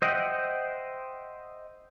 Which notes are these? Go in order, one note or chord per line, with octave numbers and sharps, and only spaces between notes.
C5 D#5 E5 F#5 G5